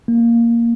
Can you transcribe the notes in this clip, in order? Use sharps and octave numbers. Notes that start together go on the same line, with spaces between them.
A#3